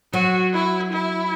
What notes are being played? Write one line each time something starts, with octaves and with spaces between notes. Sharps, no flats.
F#3 F#4
E4
E4